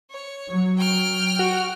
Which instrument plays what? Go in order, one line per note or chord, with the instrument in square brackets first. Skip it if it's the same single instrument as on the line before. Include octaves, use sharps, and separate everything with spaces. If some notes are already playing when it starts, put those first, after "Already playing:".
[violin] C#5
[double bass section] F#3
[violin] G5 F6
[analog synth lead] F#4